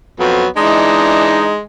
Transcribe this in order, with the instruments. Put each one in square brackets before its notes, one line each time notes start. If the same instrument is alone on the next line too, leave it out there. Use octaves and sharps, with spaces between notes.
[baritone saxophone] F2 [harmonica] F#3 B3
[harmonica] E3 D4 D#4 [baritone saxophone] G#3